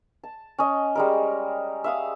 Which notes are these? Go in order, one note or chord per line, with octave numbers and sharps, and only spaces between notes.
A5
C#4 D#5
G3 G#3 A#4
E5 F5 D#6